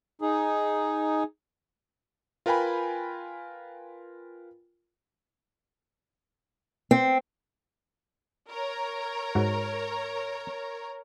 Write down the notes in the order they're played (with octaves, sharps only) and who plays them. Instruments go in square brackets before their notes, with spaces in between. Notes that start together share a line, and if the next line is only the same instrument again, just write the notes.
[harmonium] D#4 G#4
[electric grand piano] F4 A#4 B4 G5 G#5 B5
[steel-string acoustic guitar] C4
[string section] A#4 C#5 A#5
[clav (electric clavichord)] G#2 F#4